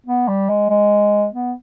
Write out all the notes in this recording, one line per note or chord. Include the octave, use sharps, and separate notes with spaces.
B3
G3
G#3
G#3
B3